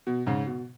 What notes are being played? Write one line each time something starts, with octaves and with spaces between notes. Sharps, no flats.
B2
G#2 C#3
B2